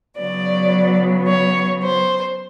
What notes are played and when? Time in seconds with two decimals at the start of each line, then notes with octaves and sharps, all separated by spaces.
0.18 C#3 F#3 B3 D5
1.28 C#5
1.83 C5